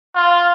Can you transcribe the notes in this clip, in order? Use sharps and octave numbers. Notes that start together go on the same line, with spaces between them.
F4